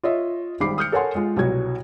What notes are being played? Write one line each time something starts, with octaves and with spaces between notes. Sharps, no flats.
F4 C#5 D#5 E5
G#1 G#2 G3 B5 D6 C7
D#6 F6 G6 C#7
A4 A#4 C#5 F#5 G#5 C6
G#3 F4
C2 B2 F#3 F#4 G#6